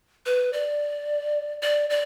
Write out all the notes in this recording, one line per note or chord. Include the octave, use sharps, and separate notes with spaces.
B4
D5
D5
D5